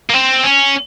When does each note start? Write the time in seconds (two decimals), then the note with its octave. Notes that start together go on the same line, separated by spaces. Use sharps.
0.10 A#3
0.14 C4
0.43 C#4